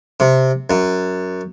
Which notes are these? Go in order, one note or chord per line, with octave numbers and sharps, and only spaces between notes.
C3
F#2